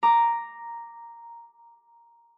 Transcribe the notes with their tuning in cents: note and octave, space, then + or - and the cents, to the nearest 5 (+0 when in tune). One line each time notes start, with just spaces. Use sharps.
A#5 +0 D6 +0